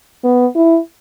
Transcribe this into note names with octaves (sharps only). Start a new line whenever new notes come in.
B3
E4